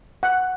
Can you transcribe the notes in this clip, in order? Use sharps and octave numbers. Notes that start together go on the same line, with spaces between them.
F#5